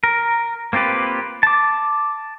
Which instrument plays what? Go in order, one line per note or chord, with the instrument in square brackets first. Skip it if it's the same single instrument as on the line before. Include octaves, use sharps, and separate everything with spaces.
[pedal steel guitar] A#4
A#3 C4 F4 G4 B4
A5 D6